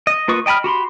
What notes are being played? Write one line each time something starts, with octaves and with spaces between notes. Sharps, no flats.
D#5
A#3 F4 B4 C#6 D#6
D#5 G5 A5 B5 F6
F#4 G4 B5 C6